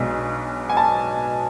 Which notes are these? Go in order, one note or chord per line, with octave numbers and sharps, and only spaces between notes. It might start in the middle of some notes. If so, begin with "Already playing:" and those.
Already playing: B1 B2 G#3 D4
G#5
A5